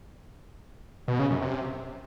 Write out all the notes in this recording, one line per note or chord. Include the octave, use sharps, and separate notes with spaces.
B2
C#3
F#2
C3